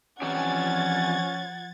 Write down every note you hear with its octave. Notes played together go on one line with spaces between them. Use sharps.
E3 F3 C4 C#4 G4 F#5 G#6 A6